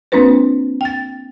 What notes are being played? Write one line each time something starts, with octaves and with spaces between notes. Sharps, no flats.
A#3 C4 D4 F4 B4 C5
G5 A6